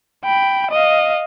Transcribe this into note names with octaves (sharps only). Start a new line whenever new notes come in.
G5 B5
D#5 F5